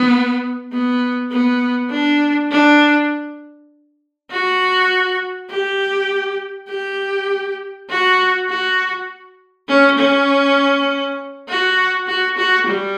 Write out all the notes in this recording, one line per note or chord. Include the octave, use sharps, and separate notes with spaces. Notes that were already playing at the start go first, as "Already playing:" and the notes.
Already playing: B3
B3
B3
D4
D4
F#4
G4
G4
F#4
F#4
C#4
C#4
F#4
F#4
F#4
G3